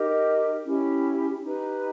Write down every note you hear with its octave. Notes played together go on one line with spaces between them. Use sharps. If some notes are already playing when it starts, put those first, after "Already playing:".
Already playing: D#4 G4 A#4 D#5
C#4 E4 G4
D#4 G4 B4